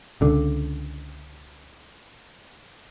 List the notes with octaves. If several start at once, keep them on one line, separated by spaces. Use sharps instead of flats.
C#2 D3